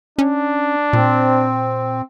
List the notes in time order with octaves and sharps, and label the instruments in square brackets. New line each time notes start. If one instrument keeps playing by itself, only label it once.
[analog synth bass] C#4 [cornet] D4
[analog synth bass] A#2 [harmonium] C4